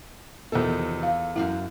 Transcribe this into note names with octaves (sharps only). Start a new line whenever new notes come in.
E2 C3 D#3 F3 A4
F5
F#2 E4 F5 F#5